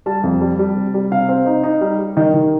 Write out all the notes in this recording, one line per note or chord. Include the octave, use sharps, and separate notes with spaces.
G3 A5
F2
G3
G3
C3
G3
C3 F5
C4
D#4
D#4
G3
G3
D#3 D#5
D#3